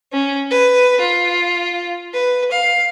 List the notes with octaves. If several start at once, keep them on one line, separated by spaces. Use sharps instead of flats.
C#4
B4
F4
B4
F5